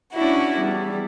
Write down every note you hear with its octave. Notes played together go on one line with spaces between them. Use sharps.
C#4 D4 E4 F#4
E2 G3